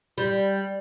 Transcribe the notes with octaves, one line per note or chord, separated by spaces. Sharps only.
G3